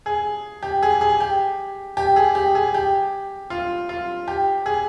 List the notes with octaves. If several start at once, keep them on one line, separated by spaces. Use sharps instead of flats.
G#4
G4
G#4
G#4
G4
G4
G#4
G4
G#4
G4
F4
F4
G4
G#4